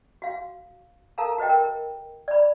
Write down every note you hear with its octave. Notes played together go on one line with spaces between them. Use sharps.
F#4 F5
A4 A#4 F5 A5 A#5
F#4 B4 D#5 G5
A#4
D5 B5